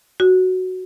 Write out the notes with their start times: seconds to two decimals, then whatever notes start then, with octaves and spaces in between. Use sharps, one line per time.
0.20 F#4